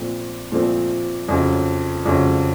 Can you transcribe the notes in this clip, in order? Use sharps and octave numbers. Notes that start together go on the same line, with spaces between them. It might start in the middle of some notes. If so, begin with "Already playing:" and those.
Already playing: A#2 F3 A3 C4
A#2 F3 A3 C4
F2 C#3 F#3
F2 C#3 F#3